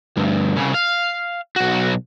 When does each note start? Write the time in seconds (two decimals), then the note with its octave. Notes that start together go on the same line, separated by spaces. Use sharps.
0.17 D2 G2
0.57 C2 C#3
0.74 F5
1.56 B1 F#4